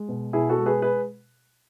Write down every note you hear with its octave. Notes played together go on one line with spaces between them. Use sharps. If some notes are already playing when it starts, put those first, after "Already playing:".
Already playing: G#3
B2
B2 E4 G#4
F#4 A4
G#3
G#4 B4
G#4 B4